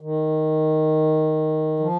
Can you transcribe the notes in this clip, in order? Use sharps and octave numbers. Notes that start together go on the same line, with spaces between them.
D#3
F3